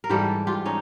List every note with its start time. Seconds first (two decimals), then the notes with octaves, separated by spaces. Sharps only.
0.04 A#4
0.09 G#2 E3 G3 G4 A4
0.47 F4 G4
0.65 C#4 D#4